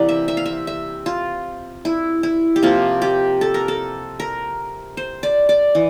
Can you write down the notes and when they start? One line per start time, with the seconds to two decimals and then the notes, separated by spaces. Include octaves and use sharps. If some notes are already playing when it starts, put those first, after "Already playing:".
Already playing: C3 E3 A#3 D5
0.09 E5
0.28 E5
0.37 F5
0.46 E5
0.67 E5
1.06 F4
1.85 E4
2.23 E4
2.56 G4
2.63 C3 F3 A#3 F4
3.02 G4
3.41 A4
3.54 A#4
3.68 A4
4.20 A#4
4.97 C5
5.23 D5
5.49 D5
5.75 E3